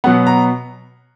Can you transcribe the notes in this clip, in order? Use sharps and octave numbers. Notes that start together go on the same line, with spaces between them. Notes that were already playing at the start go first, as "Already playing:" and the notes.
B2 F#3 B3 F#5
A#5